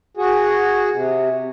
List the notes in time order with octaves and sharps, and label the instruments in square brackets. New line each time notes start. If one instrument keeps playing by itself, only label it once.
[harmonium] F#4 G#4
C3